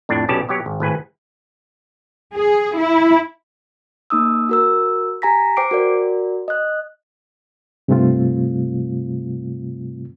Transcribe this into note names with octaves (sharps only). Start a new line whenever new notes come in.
F2 A2 D4
B1 B2 C#4 G4 D5 A5
B2 F#3 G4 C#5
G#1
G#1 A2 B4 G#5
G#4
E4
A#3 D#4 D#6 E6
F#4 A#4 E6
G4 G#5 A#5 A#6 B6
C5 G5 D6 C7 D7
F#4 A#4 D5
D#5 F#6
G2 C3 G3 A3 C4 F4